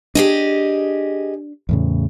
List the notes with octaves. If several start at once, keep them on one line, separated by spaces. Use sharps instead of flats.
D4 G4 G#4 D#5
E2 A2 C#3